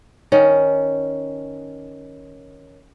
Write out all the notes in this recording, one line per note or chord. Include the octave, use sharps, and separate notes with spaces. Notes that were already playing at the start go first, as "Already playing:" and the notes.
D#3 C#4